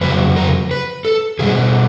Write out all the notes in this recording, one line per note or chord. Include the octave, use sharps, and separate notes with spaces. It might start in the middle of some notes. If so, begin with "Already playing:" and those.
F2 C#3 F#3 B4
A#4
B4
A4
B2 G3 G#4